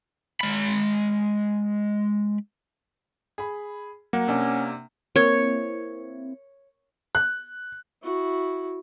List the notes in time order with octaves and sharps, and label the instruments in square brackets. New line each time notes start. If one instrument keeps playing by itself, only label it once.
[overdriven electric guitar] G#3 B5
[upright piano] G#4 B5
[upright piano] F#3 [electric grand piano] A#3 [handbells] F#5
[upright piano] C3 D4 [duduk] C#4
[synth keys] A#3 C4 E4 [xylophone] A#4 G#6 [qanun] C#5
[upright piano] F#6
[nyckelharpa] E4 F#4